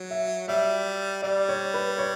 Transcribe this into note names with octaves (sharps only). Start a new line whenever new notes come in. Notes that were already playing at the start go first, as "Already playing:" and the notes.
Already playing: F#3
E5
G3 E5
G3 D5
C#5
B4
C#5